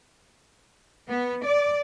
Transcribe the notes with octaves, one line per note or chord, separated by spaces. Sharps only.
B3
D5